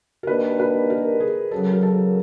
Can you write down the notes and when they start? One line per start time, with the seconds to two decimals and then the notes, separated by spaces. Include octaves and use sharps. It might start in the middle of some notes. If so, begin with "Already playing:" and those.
0.23 A#4
0.27 D#3 G3 A#3 D4 B4
0.60 B4
0.90 A#4
1.20 G#4
1.51 F#2 C#3 F#3 A4
1.73 A#4
1.83 A4